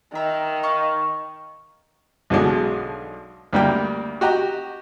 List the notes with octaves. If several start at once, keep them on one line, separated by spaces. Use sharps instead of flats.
D#3 E5 A#5
D#5 F5 C#6
B1 B2 D3 F#3 G#3
D2 G3 A#3 G5
F#4 G4 D#5 A#5